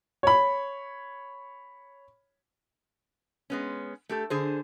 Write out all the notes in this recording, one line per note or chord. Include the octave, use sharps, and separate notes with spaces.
C#5 B5
G#3 B3 C#4
A3 G4 A4
D3 G#4 C5